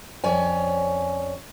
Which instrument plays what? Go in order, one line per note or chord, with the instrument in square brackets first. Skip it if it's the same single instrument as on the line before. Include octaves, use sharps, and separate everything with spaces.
[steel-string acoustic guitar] F2 C#4 C#5 D5 G#5